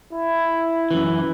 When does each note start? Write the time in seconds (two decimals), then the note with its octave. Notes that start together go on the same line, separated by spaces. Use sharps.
0.13 E4
0.91 F#2 E3